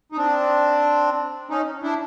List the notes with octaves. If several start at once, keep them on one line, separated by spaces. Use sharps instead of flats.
D#4
C4 D4
C#4 D#4
D4 E4